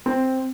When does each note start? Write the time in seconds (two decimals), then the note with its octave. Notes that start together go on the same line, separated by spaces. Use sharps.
0.06 C4